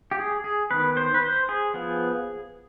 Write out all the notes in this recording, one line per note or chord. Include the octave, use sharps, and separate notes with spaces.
G4
G#4
G#4
D#3 B3 B4
C5
B4
C5
G#4
F3 B3